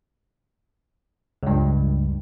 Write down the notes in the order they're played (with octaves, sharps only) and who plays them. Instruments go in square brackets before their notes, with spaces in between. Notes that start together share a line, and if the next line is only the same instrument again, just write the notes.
[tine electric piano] C#2 G2